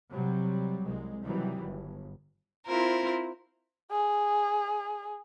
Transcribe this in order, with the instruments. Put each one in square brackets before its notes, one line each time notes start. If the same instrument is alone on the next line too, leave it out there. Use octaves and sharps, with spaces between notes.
[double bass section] C3 F#3 G3
C2 G#3
C3 D#3 E3 F#3 G3
G1
[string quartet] C4 E4 F4 A#4 C5
[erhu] G#4